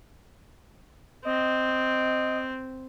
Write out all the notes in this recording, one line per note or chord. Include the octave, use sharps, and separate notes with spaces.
C4 D#5